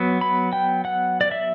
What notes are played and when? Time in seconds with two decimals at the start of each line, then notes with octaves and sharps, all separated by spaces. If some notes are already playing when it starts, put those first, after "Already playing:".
Already playing: F#3 B3
0.21 B5
0.53 G5
0.85 F#5
1.21 D5
1.31 E5